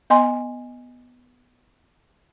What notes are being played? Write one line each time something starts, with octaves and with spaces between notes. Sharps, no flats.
B3 D#5 G#5 C6